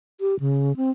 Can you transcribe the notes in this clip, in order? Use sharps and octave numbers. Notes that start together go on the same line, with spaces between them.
G4
C#3
C4